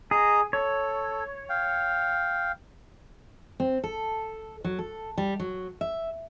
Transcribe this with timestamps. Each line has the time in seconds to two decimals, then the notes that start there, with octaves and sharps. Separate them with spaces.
0.11 G#4 D#5 A#5 D#6
0.53 A4 C#5
1.49 F5 G5
3.60 C4
3.84 A4
4.64 F#3
4.79 A4
5.18 G3
5.40 F#3
5.81 E5